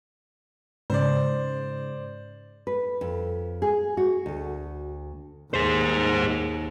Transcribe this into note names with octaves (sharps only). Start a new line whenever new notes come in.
G#2 C#3 C5 D5
B4
F2
G#4
F#4
D2
D#2 G#4 C5